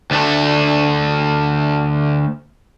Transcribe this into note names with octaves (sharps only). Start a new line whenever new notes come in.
D2 A3